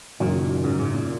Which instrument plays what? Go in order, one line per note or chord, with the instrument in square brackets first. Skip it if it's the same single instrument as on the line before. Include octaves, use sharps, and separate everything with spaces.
[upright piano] F#1 F#2 F#3 [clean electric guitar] A#2 D#3
[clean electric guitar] G#2 C#3
G#2 C#3
A#2